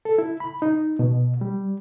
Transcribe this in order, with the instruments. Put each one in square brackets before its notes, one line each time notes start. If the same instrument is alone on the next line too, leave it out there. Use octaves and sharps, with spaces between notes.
[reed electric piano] A4
E4
B5
D#4
B2
G3